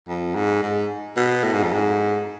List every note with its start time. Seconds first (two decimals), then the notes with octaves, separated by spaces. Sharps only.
0.08 F2
0.35 G#2
0.62 G#2
1.17 B2
1.44 A2
1.53 G#2
1.63 F2
1.73 G#2